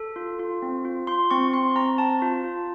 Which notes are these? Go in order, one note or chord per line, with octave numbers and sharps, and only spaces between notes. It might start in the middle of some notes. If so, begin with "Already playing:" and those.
Already playing: A4
F4
F4
C4
F4
F4 C6
C4 C#6
C4 C6
C4 A#5
C4 A5
F4
F4